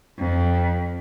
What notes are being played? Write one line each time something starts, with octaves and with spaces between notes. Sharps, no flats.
F2